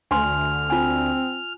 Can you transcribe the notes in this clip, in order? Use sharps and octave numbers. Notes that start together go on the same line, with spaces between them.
D2 G#5 C6 F6
C4 F4 G#5